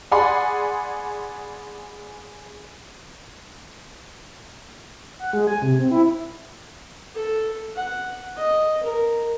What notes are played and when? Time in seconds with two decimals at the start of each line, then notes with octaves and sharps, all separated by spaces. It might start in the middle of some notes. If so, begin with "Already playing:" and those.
0.11 G#4 D5 F#5 G#5 B5 C6
5.19 F#5
5.33 G#3
5.47 G#5
5.62 C3
5.79 C4
5.91 E4
7.15 A4
7.75 F#5
8.37 D#5
8.83 A#4